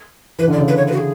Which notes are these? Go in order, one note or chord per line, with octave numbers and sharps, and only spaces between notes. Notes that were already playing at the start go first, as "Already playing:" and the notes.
E3 B4
D3
D5
C#3
B4
C#5
B4
F#4
G#4